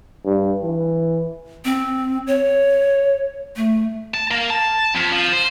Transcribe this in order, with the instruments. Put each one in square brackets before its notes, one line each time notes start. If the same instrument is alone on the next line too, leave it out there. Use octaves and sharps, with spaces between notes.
[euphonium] G2
E3
[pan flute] C4
C#5
A3
[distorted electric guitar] A5
A#3
A5
F2
F3
C5